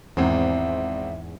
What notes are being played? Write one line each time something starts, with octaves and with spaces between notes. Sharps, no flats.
G#1 E2 G#2 C4 E5